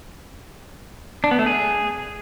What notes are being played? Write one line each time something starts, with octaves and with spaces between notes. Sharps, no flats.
D4
B3
A3
G#4